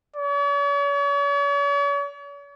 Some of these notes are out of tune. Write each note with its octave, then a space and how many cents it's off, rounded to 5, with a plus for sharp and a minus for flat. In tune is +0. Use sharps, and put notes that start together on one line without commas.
C#5 +45